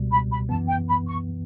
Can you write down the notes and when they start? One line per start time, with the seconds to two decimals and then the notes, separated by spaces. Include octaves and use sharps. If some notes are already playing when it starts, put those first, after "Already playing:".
Already playing: C#2 B2 G3
0.11 B5
0.30 B5
0.49 F#2 E3 B3 A5
0.68 G5
0.88 B5
1.07 C#6